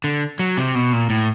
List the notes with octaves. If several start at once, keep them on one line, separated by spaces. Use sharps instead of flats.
D3
F#3
C3
B2
A#2
A2